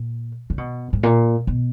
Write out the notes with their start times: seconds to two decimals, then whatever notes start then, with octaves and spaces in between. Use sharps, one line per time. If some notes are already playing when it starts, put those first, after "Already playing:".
Already playing: A#2
0.50 C#3
0.58 B2
0.93 G#2
1.03 A#2
1.47 B2